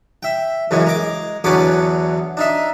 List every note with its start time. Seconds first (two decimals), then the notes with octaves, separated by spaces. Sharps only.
0.23 E5 G5
0.71 F#2 C#3 E3 G#3
0.85 G#3 A#5 D6
1.44 E2 D3 F#3 B3 C#4 D6
2.37 D4 D#4 E5